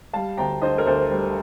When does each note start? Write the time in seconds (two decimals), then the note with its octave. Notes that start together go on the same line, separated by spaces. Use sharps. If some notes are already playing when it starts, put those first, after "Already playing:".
0.13 G3 F5 A5
0.37 D2 G5 A#5
0.62 D3 C5 D#5
0.78 A#4
0.86 D2 A4 C5
1.10 G3